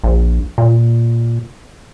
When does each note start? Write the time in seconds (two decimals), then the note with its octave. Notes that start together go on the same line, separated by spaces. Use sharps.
0.04 A#1
0.58 A#2